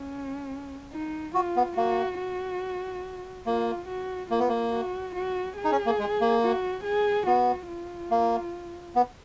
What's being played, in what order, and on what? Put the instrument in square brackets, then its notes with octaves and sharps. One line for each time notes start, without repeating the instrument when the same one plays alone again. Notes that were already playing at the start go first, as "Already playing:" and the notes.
Already playing: [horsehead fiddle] C#4
D#4
[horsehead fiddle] F4 [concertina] F#4
[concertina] B3
[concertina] A#3 [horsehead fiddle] F#4
[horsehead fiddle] F#4
[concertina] A#3 [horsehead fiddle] F4
[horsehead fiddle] F#4
[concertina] A#3 [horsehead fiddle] F4
[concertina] B3
A#3
[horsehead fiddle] F#4
F#4
G#4
[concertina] D#4
C#4
A#3
G#3
A#3
[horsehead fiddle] F#4
G#4
[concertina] B3 [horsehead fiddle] F#4
[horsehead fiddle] F4
[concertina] A#3
B3